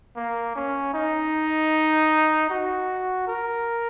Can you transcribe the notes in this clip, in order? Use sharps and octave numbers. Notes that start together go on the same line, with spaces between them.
A#3
C#4
D#4
F#4
A#4